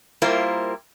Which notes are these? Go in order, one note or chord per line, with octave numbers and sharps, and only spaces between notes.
G3 A#3 E4 F4 A#4 C5